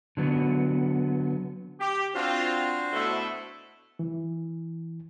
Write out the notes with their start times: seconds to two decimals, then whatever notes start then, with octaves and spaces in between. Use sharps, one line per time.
0.17 D3 F#3 B3
1.80 G4
2.15 C4 D4 F4 F#4 C5
2.93 B2 A3 E4
3.99 E3